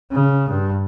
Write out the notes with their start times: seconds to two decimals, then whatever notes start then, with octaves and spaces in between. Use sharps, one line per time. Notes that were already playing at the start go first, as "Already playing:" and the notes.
0.12 C#3
0.49 G2